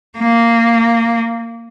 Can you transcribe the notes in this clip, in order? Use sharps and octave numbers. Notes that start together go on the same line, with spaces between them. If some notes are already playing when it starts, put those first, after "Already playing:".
A#3